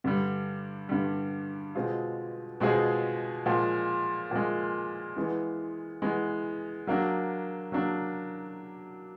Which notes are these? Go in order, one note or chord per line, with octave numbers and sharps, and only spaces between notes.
G2 D3 G3
G2 D3 G3
B2 G#3 C4 F4 G#4
B2 G#3 C4 F4 G#4
A#2 F3 G#3
A#2 F3 G#3
E3 G#3 B3
E3 G#3 B3
F#3 A#3 D4
F#3 A#3 D4